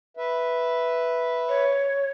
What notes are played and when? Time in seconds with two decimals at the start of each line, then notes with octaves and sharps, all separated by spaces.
0.17 B4 E5
1.49 C#5